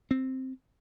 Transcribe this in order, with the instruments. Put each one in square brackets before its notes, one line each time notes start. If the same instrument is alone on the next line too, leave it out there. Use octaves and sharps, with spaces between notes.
[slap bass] C4